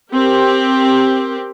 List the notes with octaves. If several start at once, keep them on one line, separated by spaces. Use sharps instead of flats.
C4 G4 A#4